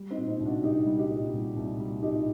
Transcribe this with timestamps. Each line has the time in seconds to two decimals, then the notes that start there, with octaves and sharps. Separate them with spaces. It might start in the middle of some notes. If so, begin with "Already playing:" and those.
Already playing: G3
0.11 C4 D#4
0.17 A#2
0.28 C4 D#4
0.40 C2
0.45 D4 F#4
0.63 C2 D#4 G4
0.86 G3
0.98 D#4 G4
1.10 A#2
1.33 C2
1.57 C2
1.80 G3
2.02 A#2 D#4 G4